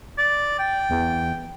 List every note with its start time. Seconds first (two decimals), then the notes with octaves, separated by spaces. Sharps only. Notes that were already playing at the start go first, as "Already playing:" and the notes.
0.18 D5
0.59 G5
0.90 E2